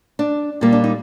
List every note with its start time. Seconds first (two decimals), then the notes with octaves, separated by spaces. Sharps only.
0.19 D4
0.61 A#2 G3 A#3
0.72 D4
0.84 D#4